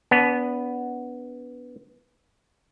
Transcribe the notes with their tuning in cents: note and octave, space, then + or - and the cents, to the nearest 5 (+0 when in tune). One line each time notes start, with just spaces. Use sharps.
B3 +0 D4 -35